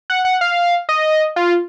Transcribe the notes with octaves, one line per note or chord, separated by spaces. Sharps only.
F#5
F#5
F5
D#5
F4